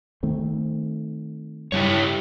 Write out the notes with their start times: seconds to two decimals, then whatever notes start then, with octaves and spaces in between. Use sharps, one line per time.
0.23 D#3 A3 C4
1.72 G2 C#3 G3 E4 G4 C#5